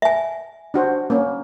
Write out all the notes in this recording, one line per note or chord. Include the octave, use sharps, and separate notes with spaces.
E5 G#5
D4 F#4 C5
A#3 C#4